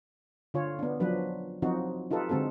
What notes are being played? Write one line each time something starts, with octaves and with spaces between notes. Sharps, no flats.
D3 F4 C#5
B3 D4
F3 F#3 D4 B4
F3 F#3 C4 D#4 F#4
D#4 F4 G4 A4 B4
D3 G#3 C4 F#4 A4